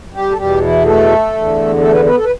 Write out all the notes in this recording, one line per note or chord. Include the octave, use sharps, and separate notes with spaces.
G3 G4
A4
E2 B2 G3 G4
E3 E4
A3 A4
E2 D3
A3 A4
B3 B4
B3 B4
A4
B4